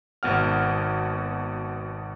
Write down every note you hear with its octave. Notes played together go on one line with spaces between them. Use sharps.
G#1 B2 F#5 F6